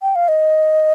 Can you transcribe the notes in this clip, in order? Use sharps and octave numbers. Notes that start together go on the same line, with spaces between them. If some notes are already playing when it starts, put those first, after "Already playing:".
G5
F5
D#5